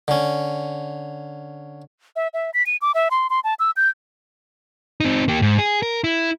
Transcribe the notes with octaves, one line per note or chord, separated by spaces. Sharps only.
D3 C#4
E5
E5
B6
D#7
D6
E5
C6
C6
A5
E6
G6
C4 D#4
A#3 G4
G#2
G#4
A#4
E4